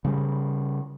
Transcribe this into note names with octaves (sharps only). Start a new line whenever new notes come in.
C#3 G3